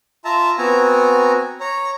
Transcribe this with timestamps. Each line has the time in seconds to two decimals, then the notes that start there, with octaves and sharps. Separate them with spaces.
0.25 F4 E5 A5 A#5
0.58 B3 C4 F#4 G#5 A#5
1.60 C#5 A#5